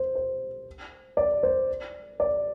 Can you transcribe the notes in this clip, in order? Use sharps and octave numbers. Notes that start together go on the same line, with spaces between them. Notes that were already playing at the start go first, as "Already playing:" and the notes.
Already playing: C5
C5
D5
C5
D5